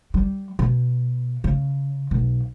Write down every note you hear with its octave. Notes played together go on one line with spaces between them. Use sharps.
G3
B2
C#3
B1